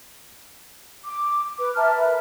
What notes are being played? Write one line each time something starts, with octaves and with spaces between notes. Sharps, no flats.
D6
B4 D6
E5 A5 A#5 F6
A#4 B4 E5